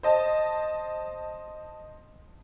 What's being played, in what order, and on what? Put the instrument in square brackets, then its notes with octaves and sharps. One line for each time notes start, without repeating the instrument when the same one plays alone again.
[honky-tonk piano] C5 D#5 A5